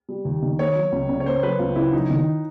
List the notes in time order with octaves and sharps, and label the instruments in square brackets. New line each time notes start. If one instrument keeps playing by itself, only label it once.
[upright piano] G3
D#2
D#3
[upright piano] A#3 [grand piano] C#5
[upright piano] F#3
C#2
C#3
[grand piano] C#5
[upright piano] A#3 [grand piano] C5
[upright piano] F#3 [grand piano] B4
[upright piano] C#2 [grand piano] F4
[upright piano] C#3 [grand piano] E4
[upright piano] F#3 [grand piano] D#4
[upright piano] D#3